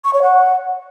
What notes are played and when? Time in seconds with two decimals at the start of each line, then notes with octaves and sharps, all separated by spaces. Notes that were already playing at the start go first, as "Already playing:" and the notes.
0.04 C#6
0.13 C#5
0.22 F#5